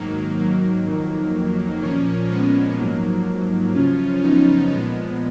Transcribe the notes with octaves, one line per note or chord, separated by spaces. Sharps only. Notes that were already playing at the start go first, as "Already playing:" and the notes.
Already playing: G#2 D#3 F#3 A#3
F#3 A#3
F2 D#3 F#3
A#2 F3 A#3 C#4
G#3 B3
G#2 F3 F#3 A#3
F#2 C#3 F3 C#4 F4
B3 D#4
A#2 F3 G#3 B3